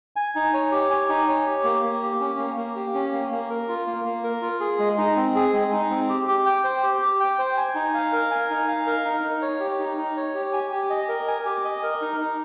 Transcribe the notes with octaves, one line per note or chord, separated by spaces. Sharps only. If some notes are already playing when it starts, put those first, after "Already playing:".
G#5
D#4
C#5
G4
G#5
D#4
C#5
G4
A#3
A#3
G4
C#4
A#3
A#3
G4
C#4
A#3
A#3
A#4
F4
A#3
A#3
A#4
F4
G#4
G#3
D#4
C4
G#4
G#3
D#4
C4
G4
G4
G5
C5
G4
G4
G5
C5
G#5
D#4
F5
A#4
G#5
D#4
F5
A#4
D#4
D#4
C#5
G4
D#4
D#4
C#5
G4
G#5
G4
D#5
A#4
G#5
G4
D#5
A#4
D#4
D#4